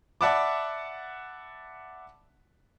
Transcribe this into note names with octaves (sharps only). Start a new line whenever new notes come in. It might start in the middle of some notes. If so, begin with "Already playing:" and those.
D5 E5 F#5 A5 B5 D6